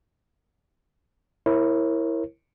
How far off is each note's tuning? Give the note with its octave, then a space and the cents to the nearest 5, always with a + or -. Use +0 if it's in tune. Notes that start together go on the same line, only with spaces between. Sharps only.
E4 +0 A#4 +0 C#5 -35